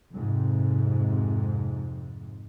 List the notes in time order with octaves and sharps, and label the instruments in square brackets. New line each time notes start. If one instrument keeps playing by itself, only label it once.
[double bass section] F2 G#2 C3